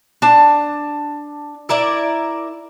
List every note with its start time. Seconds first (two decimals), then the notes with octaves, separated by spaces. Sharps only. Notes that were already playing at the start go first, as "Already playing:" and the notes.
0.22 D4 A5
1.69 E4 A#4 D5 E5